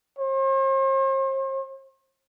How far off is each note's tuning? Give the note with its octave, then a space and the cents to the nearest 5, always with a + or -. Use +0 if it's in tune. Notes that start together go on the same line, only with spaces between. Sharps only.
C5 +45